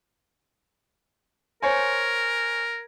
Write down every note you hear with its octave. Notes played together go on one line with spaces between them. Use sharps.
A#4 C5 C#5 G#5